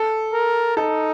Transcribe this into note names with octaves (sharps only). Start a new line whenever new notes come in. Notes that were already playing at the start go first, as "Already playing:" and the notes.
Already playing: A4
A#4
D#4 A4